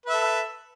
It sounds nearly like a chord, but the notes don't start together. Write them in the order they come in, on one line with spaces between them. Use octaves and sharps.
B4 E5 A4